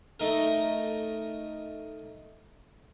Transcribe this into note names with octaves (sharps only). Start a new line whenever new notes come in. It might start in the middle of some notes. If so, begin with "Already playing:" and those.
A3 D#4 A#4